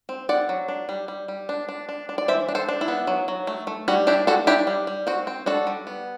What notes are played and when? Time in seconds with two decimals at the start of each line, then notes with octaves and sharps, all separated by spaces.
0.09 C4
0.29 C4 D5 F#5
0.49 F#3
0.68 D4
0.89 G3
1.08 G3
1.28 G3
1.49 D4
1.69 D4
1.89 D4
2.09 D4
2.18 D5
2.28 E3 C5 E5
2.49 D4
2.55 A4 C5
2.69 D4
2.81 E4
2.88 B3
3.07 F#3
3.28 F#3
3.47 A3
3.67 A3
3.88 G3 F#4
4.07 D4 E4 G4
4.27 G3 F#4 A4
4.47 D4 E4 G4
4.67 G3
4.87 G3
5.07 C4 F#4
5.27 C4
5.46 D4 F#4 A4
5.67 G3
5.87 B3